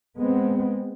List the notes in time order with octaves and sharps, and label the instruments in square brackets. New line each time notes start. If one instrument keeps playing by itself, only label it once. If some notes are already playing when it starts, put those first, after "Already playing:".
[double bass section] G#3 B3 C4